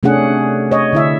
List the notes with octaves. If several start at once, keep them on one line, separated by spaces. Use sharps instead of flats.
C3 A3 C#4 D4 G#4 F#5
C#5 D#5
D3 E4 E5